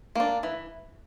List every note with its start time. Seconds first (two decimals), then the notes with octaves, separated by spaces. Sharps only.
0.15 A#3 D4
0.43 E3